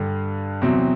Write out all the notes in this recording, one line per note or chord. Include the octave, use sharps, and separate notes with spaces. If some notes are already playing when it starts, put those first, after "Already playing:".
Already playing: G2 D3 G3
E2 C3 F#3 C4